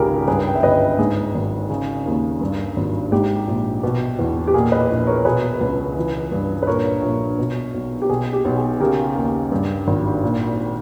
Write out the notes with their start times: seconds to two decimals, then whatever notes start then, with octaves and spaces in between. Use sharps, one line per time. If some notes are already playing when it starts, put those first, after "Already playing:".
Already playing: G#1 C#2 G#2 C#3 G4 G#4 A#4
0.28 G2 G#4 B4
0.47 G5
0.55 E5
0.63 G1 B4 D#5
0.98 G#2 G#4
1.34 G#1
1.70 C#3
2.06 D#2
2.41 G2
2.76 G#1
3.12 G#2 G4
3.47 A#1
3.83 B2
4.19 E2
4.47 G4
4.54 A#2 G#4
4.72 B4 D#5
4.90 A#1
5.07 A#4 C#5
5.25 B2 G#4 B4
5.61 C#2
5.96 E3
6.32 G2
6.63 B4
6.67 A#2 A#4 C#5
7.03 A#1
7.38 B2
7.74 B1
8.02 G4
8.09 B2 G#4
8.33 G4
8.45 B1
8.57 G#4
8.75 G#4
8.80 C#3 G4 A#4
9.16 D#2
9.52 G2
9.87 G#1
10.23 A#2